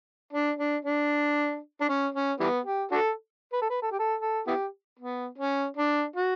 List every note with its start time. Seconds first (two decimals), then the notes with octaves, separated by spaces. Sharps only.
0.33 D4
0.59 D4
0.85 D4
1.81 D4
1.89 C#4
2.14 C#4
2.40 E3 G3 B3
2.65 G4
2.92 D4 F#4 A4
3.53 B4
3.61 A4
3.70 B4
3.82 A4
3.91 G4
3.99 A4
4.21 A4
4.47 B3 E4 G4
4.99 B3
5.38 C#4
5.77 D4
6.16 F#4